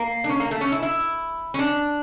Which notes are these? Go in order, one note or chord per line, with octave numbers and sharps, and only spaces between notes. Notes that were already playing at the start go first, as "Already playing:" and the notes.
Already playing: A#3
D4
C#4
A#3
A3
C#4
E4
E4
C#4
D4